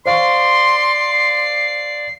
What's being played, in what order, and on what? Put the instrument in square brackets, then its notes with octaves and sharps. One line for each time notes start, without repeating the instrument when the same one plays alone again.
[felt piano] C5 F5 C#6 [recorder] D5 [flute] C6 [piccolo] C7